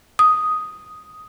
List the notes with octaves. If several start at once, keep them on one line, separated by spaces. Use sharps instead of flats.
D#6